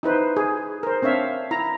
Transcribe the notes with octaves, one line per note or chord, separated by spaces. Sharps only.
D#4 E4 B4 C5
G#4
A#4 C5
C4 D4 C#5 E5 F5
E4 A#5